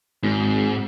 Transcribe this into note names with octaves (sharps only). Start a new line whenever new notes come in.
G#1 G#2